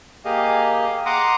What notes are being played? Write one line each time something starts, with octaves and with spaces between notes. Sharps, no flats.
A#3 G4 G#4 D#5 F5
F#5 A#5 C6 D6 D#6